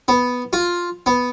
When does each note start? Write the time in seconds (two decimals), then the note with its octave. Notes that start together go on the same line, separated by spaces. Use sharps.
0.08 B3
0.53 F4
1.06 B3